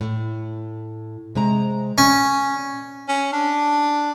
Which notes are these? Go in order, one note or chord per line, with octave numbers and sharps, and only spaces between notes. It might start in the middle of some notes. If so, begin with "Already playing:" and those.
A2
C3 G#3 A#5
A#2 C#4
C#4
D4